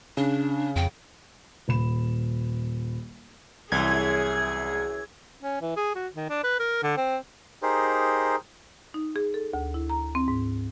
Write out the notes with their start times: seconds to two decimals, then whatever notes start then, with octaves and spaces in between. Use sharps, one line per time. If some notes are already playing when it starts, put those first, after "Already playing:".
0.17 C#3 D4
0.76 F2 G5
1.68 D#1 B5 E7
3.72 C2 F#2 E3 G#4 G#6
5.42 C#4
5.61 E3
5.76 G#4
5.95 F#4
6.15 D#3
6.29 D4
6.43 B4
6.59 A#4
6.82 D3
6.97 C4
7.62 D#4 G4 G#4 A#4 C5
8.94 D#4
9.16 G#4
9.34 A4
9.53 D2
9.74 E4
9.90 A#5
10.15 C4
10.28 G#2